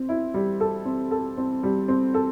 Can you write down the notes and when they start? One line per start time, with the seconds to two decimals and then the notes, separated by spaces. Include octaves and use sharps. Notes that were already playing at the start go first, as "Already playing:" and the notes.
Already playing: C4
0.09 E4
0.34 G3
0.60 A4
0.85 C4
1.11 A4
1.38 C4
1.63 G3
1.88 C4
2.14 A4